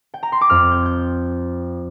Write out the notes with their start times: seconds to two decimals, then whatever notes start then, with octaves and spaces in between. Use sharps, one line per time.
0.14 G5
0.23 A#5
0.32 C6
0.41 D6
0.50 F2 F6
0.71 G6
0.86 G6